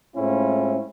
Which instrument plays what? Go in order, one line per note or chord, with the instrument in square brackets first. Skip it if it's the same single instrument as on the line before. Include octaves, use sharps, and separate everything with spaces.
[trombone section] A2 G#3 C4 C#4 E4 F4